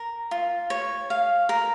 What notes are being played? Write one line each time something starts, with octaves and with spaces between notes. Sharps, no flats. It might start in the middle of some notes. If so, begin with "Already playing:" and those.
Already playing: A#4
F4
C#5
F5
A#4